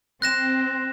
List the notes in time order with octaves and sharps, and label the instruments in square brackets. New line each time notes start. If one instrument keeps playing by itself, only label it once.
[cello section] C4 [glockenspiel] F#6 A#6 E7